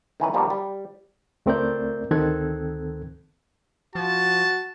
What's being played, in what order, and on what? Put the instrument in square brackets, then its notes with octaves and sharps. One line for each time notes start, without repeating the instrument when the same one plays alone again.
[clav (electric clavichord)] D#3 E3 C#4 B4
B2 D#3 F3 G3 A#3
G3
[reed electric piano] C#2 A3 C4 A#4 D5 G6
D2 D#3 C4 A4 F#6 G#6
[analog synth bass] F3 [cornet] F#4 [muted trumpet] A5